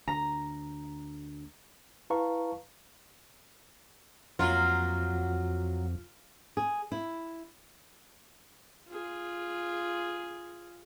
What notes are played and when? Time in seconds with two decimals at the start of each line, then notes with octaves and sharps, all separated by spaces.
0.08 D2 A#5
2.10 E4 B4 F5 A5 A#5 C#6
4.39 F2 F#3 A#3 F4 F#4
6.57 G#4
6.92 E4
8.88 F4 G#4